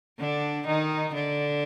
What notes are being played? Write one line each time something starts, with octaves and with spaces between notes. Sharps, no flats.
D3 D4
D#3 D#4
D3 D4